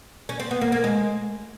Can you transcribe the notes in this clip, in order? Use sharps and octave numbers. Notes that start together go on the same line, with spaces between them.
C#4
C4
B3
A#3
A#3
G#3